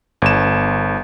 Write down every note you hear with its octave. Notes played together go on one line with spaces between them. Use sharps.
G1 E7